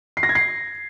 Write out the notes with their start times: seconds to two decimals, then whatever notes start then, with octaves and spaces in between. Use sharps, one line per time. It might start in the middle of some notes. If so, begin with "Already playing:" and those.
0.17 C7
0.23 A#6
0.29 G#6
0.35 C7